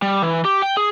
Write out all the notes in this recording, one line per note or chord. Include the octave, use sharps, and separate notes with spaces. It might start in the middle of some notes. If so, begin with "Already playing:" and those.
G3
E3
G4
G5
G#4